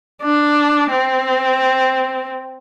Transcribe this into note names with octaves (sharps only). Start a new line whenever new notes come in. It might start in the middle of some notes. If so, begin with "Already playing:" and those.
D4
C4